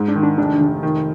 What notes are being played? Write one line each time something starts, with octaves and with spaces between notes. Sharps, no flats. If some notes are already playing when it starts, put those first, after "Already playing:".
Already playing: G#2
D4
D#3
D4
F1 D4
F1
D#3